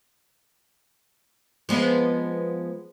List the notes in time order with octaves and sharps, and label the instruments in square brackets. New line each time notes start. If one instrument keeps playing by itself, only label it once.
[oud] F3 G#3 B3